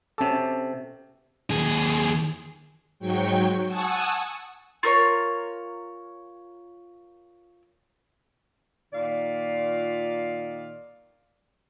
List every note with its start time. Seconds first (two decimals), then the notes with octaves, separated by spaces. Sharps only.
0.18 C3 C#4 A4 A5 D6
1.50 D#2 G#4
2.99 G#2 F#3 G5 C#6
3.68 F#5 G#5 A5 C#6 D#6 E6
4.83 F4 A#4 C#5
8.93 A#2 D#3 F4 D5 F5